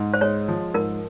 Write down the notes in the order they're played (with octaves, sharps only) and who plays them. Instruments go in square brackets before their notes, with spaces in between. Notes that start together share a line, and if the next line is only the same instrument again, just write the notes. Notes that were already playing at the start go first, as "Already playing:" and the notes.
Already playing: [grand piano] G#2
[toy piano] C5
[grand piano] G#3 [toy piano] C#5
[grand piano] F3
[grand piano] G#2 [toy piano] A#4